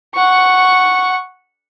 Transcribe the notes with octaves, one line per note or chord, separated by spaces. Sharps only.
F#5 C#6